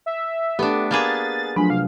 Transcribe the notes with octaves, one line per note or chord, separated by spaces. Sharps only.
E5
A3 B3 D4 G4 B4
A#3 B3 G#4 A6
F3 F#3 A3 D4 G#5 B5 C6
C3 F5